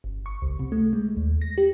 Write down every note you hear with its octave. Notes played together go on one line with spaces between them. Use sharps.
G1
C#6
C#2
C3
A3
G#3
D#2
A#6
G4